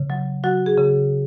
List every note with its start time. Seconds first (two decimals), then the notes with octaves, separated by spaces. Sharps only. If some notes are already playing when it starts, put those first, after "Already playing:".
Already playing: C#3
0.10 F#3
0.44 F#3 F#4
0.66 G#4
0.77 C#3